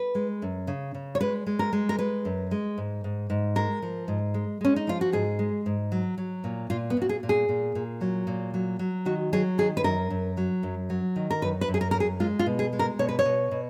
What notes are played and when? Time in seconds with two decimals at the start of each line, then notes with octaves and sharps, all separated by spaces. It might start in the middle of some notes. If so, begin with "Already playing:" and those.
Already playing: B4
0.15 G#3
0.42 F#2
0.67 C#3
0.95 C#3
1.15 C#5
1.21 G#3 B4
1.47 G#3
1.59 A#4
1.73 G#3
1.89 A#4
1.99 G#3 B4
2.25 F#2
2.51 G#3
2.78 G#2
3.04 G#2
3.30 G#2
3.56 G#3 A#4
3.82 F3
4.08 G#2
4.34 G#3
4.61 G#3 C#4
4.76 D#4
4.87 F3 F4
5.01 F#4
5.12 G#2 G#4
5.39 G#3
5.66 G#2
5.92 F#3
6.18 F#3
6.44 A#2
6.70 A#2 F4
6.90 B3
6.97 A#2 F#4
7.09 G#4
7.23 A#2
7.29 G#4
7.49 A#2
7.75 A#2
8.01 F#3
8.27 A#2
8.54 F#3
8.79 F#3
9.06 D#3 F#4
9.33 F#3 G#4
9.58 D#3 G#4
9.77 B4
9.84 F#2 A#4
10.10 F#2
10.37 F#3
10.63 F#2
10.90 F#3
11.16 D#3
11.31 A#4
11.42 F#2 B4
11.61 B4
11.68 F#2
11.74 G#4
11.81 A#4
11.91 F#2 A#4
12.00 G#4
12.20 G#3 F4
12.39 F4
12.46 B2
12.59 G#4
12.73 G#3
12.79 A#4
12.99 B2 C#5
13.09 B4
13.19 C#5
13.25 B2
13.51 B2